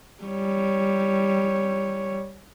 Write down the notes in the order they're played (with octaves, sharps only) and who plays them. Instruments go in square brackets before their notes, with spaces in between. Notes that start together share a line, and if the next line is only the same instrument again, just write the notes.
[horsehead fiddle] G3 C#5